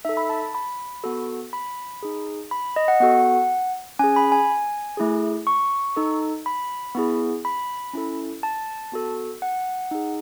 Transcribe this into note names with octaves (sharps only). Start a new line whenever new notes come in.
D#4 A4 E5
B5
A5
B5
B3 F#4 A4
B5
D#4 G#4
B5
D#5
F#5
B3 F#4 A4 F#5
C#4 G#4 G#5
B5
G#5
A3 E4 G#4
C#6
D#4 A4
B5
B3 E4 G#4
B5
C#4 E4 A4
A5
B3 F#4 A4
F#5
D#4 G#4